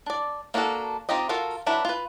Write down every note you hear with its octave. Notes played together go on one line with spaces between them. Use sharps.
D4 D5
A#3 D4 F#4 G#4 A4
C4 D#4 F4 G4 D#5
F4 F#4 A4 A#4 F5
F#3 D4 E4 B4 B5
F4 B4